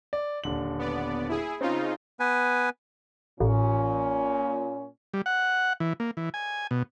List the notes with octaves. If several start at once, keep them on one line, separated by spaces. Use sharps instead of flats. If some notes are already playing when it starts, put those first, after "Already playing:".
D5
D#1 D3 F#7
B3 D5
E4 G#4
C#3 C4 D#4 F4
B3 B4 G#5
A1 A#2 C#4
G3
F#5
E3
A#3
E3
G#5
B2